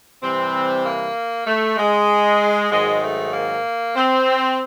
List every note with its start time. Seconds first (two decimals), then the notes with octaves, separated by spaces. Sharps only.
0.22 C3 E3 G3 C4
0.84 A#3
1.46 A3
1.77 G#3
2.71 G#2 D#3 F#3 G#3
3.01 A3
3.33 A#3
3.95 C4